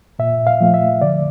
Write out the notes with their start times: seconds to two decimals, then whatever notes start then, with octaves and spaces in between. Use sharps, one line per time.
0.19 A#2 E5
0.47 F5
0.61 F3 A3
0.74 E5
1.01 D3 D5